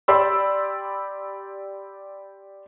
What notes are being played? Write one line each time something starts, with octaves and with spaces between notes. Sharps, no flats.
G4 D5 B5 C6 E6